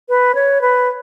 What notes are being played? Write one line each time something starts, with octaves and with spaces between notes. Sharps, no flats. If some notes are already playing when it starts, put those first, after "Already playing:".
B4
C#5
B4